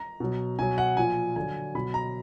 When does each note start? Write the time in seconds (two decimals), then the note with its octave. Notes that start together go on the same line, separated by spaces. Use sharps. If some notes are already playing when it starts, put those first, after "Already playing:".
Already playing: A#5
0.20 B2 F#3
0.59 B2 F#3 G#5
0.78 F#5
0.97 A#2 F3 G#5
1.36 D3 F#3 G#5
1.75 B2 F#3 B5
1.94 A#5